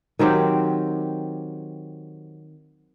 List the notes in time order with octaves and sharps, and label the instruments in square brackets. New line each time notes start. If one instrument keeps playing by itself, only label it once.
[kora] D#3 F#3 C4 G4